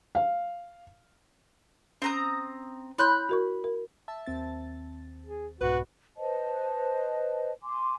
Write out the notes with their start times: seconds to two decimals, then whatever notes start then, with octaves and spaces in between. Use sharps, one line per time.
0.15 F5
2.02 C4 C#4 A#5 D#6
2.98 E4 C#5 B5 C6 F#6 G6
3.29 F#4 A#4 C#6
3.64 A#4
4.08 E5 A5
4.26 D#2 C4 A6
5.26 G#4
5.61 C2 G#2 B2 F#4 B4
6.17 B4 C5 D#5 A5
7.63 G#5 C6 D6